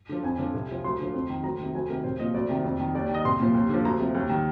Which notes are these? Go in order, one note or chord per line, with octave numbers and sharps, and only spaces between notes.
D3 F3
F2 G#5
D3 F3
C2
C3 F3
D2 C6
D3 F3
F2
D#3
D2 A#5
C3 D#3
D2 G#5
C3 D#3 A#4
C2 C5
A#2 F3 D#5
D2 D5
C3 D#3
F2
D#3
D#2 D5
D#3
D#5
C2 C6
A#2 F3
D#2
D3 F3
D2 A#5
C3 F3
D#2
D#3